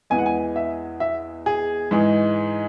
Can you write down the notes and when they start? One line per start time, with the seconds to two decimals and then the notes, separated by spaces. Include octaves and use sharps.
0.10 E2 E3 G#3 G#5
0.18 F#5
0.26 G#5
0.56 E5
1.00 E5
1.46 G#4
1.91 G#2 E3 G#3